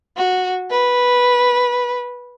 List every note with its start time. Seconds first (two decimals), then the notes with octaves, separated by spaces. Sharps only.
0.17 F#4
0.71 B4